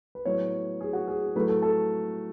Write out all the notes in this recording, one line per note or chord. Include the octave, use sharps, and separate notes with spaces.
B4
A2 F#3 B3 C#5
G#4
F#4
G#4
A2 F#3 A3 B4
A4
A4